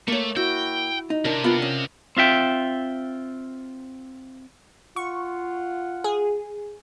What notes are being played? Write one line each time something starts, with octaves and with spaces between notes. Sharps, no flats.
A3 A#3 C#5
E4 F#4 G5
D#4
C3 D4 A#4
B3 D4 F4 F#5
C#4 D#5
C4 F4 E5 G5
F4 F#5 C#6
G#4